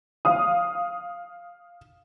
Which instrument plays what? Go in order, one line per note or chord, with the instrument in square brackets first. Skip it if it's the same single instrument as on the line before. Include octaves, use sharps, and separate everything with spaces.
[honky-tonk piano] F5 D#6